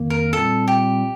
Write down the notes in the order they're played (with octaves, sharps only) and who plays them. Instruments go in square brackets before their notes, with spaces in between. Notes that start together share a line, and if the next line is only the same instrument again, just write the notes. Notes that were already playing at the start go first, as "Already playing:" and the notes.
Already playing: [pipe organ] F2 D#3 A#3
[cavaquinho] A#4
[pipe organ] A#2 G3 C4 [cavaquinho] A4
[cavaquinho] G4